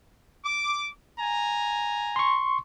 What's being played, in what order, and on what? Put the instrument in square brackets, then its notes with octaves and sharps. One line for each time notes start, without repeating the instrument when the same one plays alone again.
[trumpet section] D6
G#5 A#5
[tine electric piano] C6 C#6